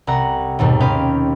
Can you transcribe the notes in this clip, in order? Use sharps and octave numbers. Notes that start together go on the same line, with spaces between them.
C2 F#5 A#5
D#2 G#2 B2 G3
C4 C#4 D#4 G4 B4 F5